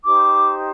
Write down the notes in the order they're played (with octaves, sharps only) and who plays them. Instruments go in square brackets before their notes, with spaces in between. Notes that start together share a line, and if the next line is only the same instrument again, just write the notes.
[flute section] D#4 G4 C5 D6